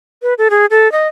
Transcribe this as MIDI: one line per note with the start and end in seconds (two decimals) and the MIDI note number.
0.22 0.34 71
0.38 0.48 69
0.50 0.66 68
0.71 0.91 69
0.92 1.08 75